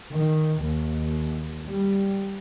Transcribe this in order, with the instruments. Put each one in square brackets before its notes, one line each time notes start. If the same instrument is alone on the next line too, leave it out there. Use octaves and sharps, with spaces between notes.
[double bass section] D#3
D#2
G3